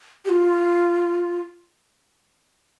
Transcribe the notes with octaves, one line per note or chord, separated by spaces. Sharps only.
G4
F4